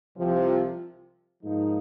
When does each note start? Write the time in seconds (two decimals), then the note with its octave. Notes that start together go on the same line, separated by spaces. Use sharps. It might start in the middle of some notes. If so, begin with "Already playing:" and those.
0.17 C2 C3 F3
1.42 G#2 F3 A#3 D#4